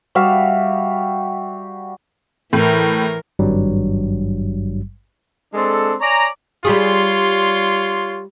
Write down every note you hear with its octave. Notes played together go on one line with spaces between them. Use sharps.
G3 F#4 E5 F5
A2 E3 A#4
G#1 G2 F#3 G3
G#3 C4 D4 A4
C#5 D5 G#5 A#5
G3 F4 G4 G#4 C#5 C6